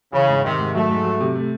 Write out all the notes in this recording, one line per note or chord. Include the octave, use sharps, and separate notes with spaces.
C#3 E3
G#2
C3 D#3
G#2
F#3 A3
G#2
F#3
C3
A3